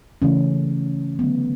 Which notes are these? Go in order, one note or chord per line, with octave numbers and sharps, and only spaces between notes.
C#3 E3 A3 C#4
D3 F#3 A3 B3